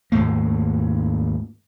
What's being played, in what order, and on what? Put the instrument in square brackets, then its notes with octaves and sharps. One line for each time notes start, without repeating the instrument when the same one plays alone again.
[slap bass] D#2 G#2 A3 A#3